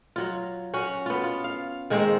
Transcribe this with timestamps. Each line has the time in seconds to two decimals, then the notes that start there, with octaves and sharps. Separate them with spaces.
0.16 F#3 F4
0.74 C#4 F#4
1.06 B3 F4
1.24 F4
1.44 F5
1.90 D#3 G#3 A#3 C4